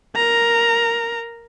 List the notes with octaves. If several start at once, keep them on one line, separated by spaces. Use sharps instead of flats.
A#4 A#5